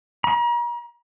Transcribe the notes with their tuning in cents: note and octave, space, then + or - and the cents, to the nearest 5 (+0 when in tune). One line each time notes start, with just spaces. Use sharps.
A#5 +40